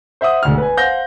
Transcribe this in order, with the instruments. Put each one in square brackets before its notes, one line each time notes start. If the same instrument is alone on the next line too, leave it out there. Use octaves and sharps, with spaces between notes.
[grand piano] C5 E5 F#5 D#6
E1 D2 F6
B4 G#5
C5 F5 F#5 G6 A#6